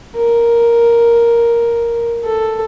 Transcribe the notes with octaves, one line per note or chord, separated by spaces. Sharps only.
A#4
A4